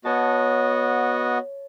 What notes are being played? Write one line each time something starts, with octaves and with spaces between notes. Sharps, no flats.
B3 F#4 C#5 D#5 A5